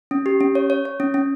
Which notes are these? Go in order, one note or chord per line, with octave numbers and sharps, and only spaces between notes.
C#4
G4
C#4
C#5
C#5
C#5
C#4
C#4